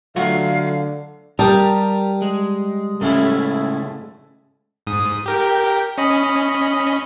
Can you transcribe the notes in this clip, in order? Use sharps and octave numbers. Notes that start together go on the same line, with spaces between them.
D3 F#3 A3 F4 F#4 F5
G3 G4 A#4 A5 D#6
G#3
A2 C#3 G#3 A3 C#4 E4
G#2 D#6
G4 A#4 G5
C#4 D#5 B5